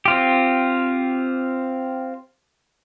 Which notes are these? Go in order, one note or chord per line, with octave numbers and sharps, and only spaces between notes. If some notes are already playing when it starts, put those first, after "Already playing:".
C4 F4 G4